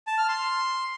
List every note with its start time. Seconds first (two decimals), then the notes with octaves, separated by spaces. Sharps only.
0.07 A5
0.18 F6
0.29 C6